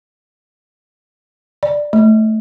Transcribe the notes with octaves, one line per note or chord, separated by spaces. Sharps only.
D5
A3